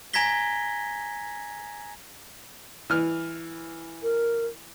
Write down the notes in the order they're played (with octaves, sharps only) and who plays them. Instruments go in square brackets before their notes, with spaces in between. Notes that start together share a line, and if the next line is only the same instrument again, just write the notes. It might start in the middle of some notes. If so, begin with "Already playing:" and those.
[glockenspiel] G#5 A#5 G#6 A#6 B6 G7
[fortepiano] E3 F6
[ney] A#4